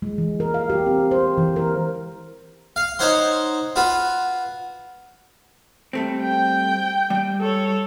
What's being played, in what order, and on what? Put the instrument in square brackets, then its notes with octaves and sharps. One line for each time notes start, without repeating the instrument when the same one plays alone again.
[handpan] G#3
E3
A#4
F5
G4
C4
C5
E3
A#4
[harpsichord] F5
D#4 C5 C#5 F#5 C6
F4 F#4 B4
[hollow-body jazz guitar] G3 A3 C4
[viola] G5
[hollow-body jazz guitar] G3 G5
[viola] A4 C#5